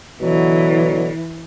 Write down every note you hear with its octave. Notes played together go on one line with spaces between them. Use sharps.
B2 D3 E3 F#3